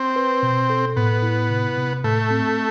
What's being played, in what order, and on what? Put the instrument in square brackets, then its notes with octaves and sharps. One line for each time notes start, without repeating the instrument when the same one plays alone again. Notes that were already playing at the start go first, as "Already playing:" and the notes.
Already playing: [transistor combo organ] C4
[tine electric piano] B4
B2
A4
[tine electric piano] A2 [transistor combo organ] B3
[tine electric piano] E4
C3
C3
[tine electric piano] A2 [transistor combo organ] A3
[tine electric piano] C4